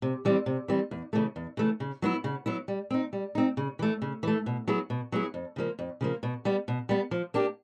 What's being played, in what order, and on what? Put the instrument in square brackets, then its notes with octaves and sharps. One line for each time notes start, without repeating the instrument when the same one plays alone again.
[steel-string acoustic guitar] C3
E3 G3 C4
C3
E3 G3 C4
E2
C#3 E3 A3
E2
C#3 E3 A3
C#3
F#3 B3 E4
C#3
F#3 B3 E4
G3
C4 D#4
G3
C4 D#4
C#3
E3 A3
C#3
E3 A3
B2
F#3 B3 E4 G#4
B2
F#3 B3 E4 G#4
F2
C#3 F3 A#3
F2
C#3 F3 A#3
B2
G3 B3
B2
G3 B3
F3
A#3 D4 G4